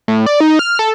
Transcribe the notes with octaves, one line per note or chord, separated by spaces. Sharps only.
A2
D5
D#4
F6
A4